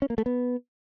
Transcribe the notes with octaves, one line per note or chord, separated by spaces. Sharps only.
C#4
A#3
A3
B3